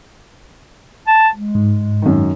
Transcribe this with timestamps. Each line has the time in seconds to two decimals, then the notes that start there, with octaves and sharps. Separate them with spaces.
1.07 A5
1.35 G#3
1.55 G#2
2.02 F#2 D#3